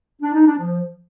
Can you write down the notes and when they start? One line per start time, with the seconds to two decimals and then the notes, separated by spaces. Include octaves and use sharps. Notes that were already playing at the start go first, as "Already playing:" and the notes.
0.22 D4
0.34 D#4
0.46 D4
0.58 F3